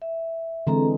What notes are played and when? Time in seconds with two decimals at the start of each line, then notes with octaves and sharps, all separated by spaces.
0.02 E5
0.67 D3 E3 G#3 C4 A4 A#5